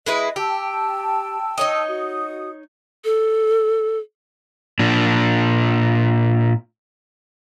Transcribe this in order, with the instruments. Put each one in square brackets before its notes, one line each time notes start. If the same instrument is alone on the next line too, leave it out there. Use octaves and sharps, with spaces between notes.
[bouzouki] G#3 E4 B4 [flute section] D#5
[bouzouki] G4 [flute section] G5 A5 E6
[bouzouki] D#4 C#5 D#5
[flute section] F#4 D#6
[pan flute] A4
[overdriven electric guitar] A#2 D4